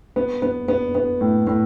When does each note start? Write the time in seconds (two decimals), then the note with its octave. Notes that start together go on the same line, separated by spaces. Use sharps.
0.16 B3
0.42 B3
0.68 B3
0.95 B3
1.21 A2
1.47 A2